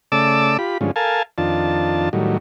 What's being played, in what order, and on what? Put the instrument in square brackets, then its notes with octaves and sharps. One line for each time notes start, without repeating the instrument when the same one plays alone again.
[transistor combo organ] C#3 A3 D5 A5 D6 E6
F4 G4 B5
G2 D3 F3 G#3 C#4
A4 A#4 F5 G#5 A5
F2 D#3 D4 F4 A5
A2 D#3 F#3 G3